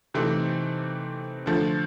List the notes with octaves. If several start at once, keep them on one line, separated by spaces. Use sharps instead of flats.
C3 E3 A3 C4 D#4
D3 F3 A3